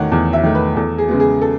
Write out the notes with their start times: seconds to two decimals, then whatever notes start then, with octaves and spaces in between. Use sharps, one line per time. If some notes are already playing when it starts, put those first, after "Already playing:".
Already playing: E2 D#3 A3 C#5 F#5
0.12 E2
0.33 E5
0.43 D#3 A3
0.55 B4
0.76 E2 A4
0.98 G#4
1.08 C#3 G#3 B3
1.20 G#4
1.41 A4